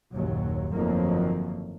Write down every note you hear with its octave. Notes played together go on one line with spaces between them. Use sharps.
F#1 D#2 A#2 F#3
G1 F2 D#3 F#3 A3 A#3